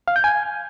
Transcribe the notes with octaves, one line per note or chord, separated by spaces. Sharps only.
F5
G6
G#5